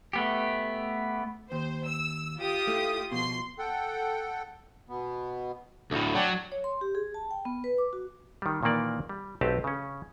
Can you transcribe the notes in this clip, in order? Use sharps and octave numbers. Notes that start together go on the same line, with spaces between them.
A3 B3 G4
D#2 C5
E6
F4 G4 D#6
A3 E4
B2 F3 C6 C7
A4 F#5 G5
B2 B3
D2 A2 A4
F#3 D5 G5 A5
C#5
C6
G4
G#4
A5
G5
B3
B4
D6
F#4
D#3 G3
A#2 D#3 E3 A#3 D5
G3
B1 A3 C4 G4 B4 A5
C#3 C#4